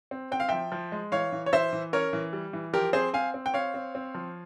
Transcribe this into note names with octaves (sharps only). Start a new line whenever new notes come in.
C4
C4 G5
F5
F3 E5 G5
F3
G#3
E3 C#5 F5
E3
C#5
E3 C5 E5
E3
C#4 A#4 C#5
E3
G3
E3
F3 G4 A#4
C4 G#4 C5
C4 F5 G#5
C4
G5
C4 C#5 F5
C4
C4
F3